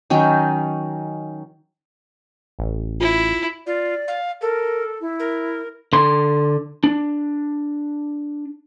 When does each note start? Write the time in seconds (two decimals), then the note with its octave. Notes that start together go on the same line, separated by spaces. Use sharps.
0.10 D#3 F#3 C#4 G5
2.59 A1
3.01 E4 F4
3.67 F4 D5
4.08 F5
4.41 A4 A#4
5.01 E4
5.20 A#4
5.93 D3 C6
6.84 D4